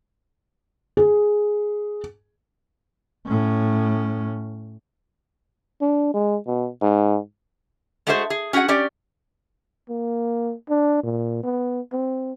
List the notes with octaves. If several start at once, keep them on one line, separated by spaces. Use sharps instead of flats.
G#4
A2 C#4
D4
G#3
B2
G#2
G#3 A3 F#4 G#4 A4 C5
G#4
C#4 F#4 G#4 F5 F#5
C#4 G4 D5
A#3
D4
A#2
B3
C4